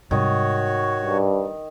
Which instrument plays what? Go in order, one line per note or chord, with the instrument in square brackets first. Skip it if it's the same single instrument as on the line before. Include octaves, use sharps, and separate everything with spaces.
[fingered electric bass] G#2 C3 G3 [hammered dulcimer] D#3 D#5 [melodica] F#4 C#5
[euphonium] G2